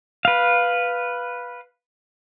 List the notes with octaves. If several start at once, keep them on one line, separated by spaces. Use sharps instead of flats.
B4 F5